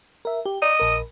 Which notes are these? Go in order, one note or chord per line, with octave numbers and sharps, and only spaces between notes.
A#4 E5
G4
D5 D#5
A#1 A#4